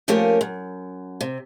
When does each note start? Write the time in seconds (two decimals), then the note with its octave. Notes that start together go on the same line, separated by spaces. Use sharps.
0.08 F3 A3 A#3 C#4 G4 A#4
0.41 F#2
1.21 C3